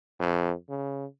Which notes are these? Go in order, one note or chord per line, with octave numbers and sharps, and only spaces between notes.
F2
C#3